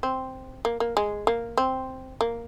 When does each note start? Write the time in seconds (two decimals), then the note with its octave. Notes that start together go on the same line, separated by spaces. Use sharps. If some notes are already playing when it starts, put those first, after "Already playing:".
0.03 C4
0.65 A#3
0.80 A#3
0.97 G#3
1.27 A#3
1.57 C4
2.21 A#3